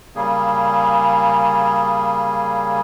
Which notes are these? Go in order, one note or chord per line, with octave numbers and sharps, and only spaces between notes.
C#3 G3 A#3 G#4